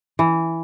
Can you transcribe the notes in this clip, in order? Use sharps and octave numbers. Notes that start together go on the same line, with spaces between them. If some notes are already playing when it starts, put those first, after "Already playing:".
E3